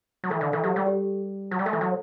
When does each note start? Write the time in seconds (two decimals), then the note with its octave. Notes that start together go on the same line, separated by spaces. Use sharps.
0.24 F#3
0.30 E3 A4
0.41 D3
0.53 E3 A4
0.64 F#3 G4
0.76 G3
0.87 G4
1.51 F#3
1.59 G3
1.66 A3 A4
1.73 E3
1.81 F#3